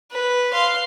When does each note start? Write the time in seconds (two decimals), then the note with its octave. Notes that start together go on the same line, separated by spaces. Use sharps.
0.11 B4
0.53 F5 C6